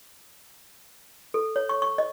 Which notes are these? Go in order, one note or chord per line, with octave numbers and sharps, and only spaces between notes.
A4
C#5
C#6
C#6
D#5